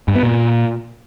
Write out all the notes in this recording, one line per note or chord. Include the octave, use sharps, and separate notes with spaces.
G2
B3
A#2